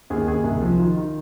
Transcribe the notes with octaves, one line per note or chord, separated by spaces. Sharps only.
D#2 G#4
D#2 G#4
C2
F3
D#3 F4
D#3